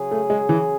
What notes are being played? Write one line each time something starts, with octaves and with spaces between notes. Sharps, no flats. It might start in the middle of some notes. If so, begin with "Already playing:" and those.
Already playing: C#3 F#3 C#4 G#4
A3
G#3
E3